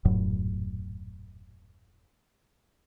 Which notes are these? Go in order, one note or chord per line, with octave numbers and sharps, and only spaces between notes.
D#1 F#2 A2 F#3